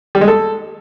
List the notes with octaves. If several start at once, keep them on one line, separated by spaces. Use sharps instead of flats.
G3
G#3
A4